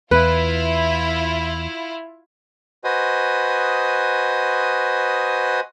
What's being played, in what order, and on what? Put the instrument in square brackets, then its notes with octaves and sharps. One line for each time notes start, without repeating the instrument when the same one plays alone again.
[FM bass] E2 [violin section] E4 F4 [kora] B4
[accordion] F#4 B4 C5 D#5 G#5 D#6